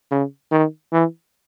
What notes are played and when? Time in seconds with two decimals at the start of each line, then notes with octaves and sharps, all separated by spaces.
0.11 C#3
0.52 D#3
0.92 E3